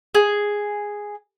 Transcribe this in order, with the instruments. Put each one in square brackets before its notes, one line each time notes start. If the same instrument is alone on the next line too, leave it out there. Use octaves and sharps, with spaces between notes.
[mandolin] G#4